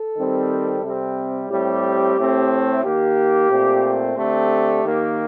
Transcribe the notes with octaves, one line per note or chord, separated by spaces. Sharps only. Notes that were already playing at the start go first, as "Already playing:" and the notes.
Already playing: A4
D#3 G3 C4
C3 G3 C4
A2 G3 C4 G4
A2 A3 C4
D#3 A#3 G4
A#2 A3 C4
D3 A3 C4 G4
D#3 A#3